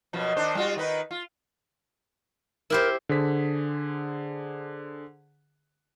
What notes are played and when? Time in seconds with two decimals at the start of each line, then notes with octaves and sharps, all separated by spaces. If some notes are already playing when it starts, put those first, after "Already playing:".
0.13 F#2 B2 F3
0.37 D#3 D4 C5
0.55 G3 F4 F#4
0.76 D#3 D#4 B4
1.11 F4
2.70 E4 G4 A#4 C5
3.09 D3 G#4 C5 B6